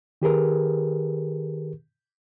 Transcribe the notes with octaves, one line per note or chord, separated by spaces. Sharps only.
D#3 G4 G#4 A#4 B4